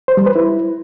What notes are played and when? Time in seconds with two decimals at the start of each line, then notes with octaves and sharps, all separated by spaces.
0.08 C5
0.17 G3
0.26 B4
0.36 E4